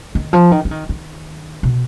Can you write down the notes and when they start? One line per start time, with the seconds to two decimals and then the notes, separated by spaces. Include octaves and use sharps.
0.15 D#3
0.33 F3
0.51 D#3
0.65 F3
0.71 D#3
0.89 D#3
1.63 B2